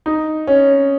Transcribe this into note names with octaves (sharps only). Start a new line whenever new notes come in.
D#4
C#4